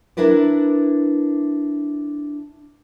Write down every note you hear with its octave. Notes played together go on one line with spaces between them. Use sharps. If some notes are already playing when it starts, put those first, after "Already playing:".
D4 E4 A#4 B4 D5